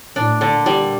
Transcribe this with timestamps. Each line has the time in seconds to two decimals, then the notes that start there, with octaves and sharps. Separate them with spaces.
0.15 A2 D4
0.41 D3
0.53 A#2
0.66 G3